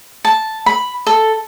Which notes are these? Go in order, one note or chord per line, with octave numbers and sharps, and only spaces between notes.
A5
B5
A4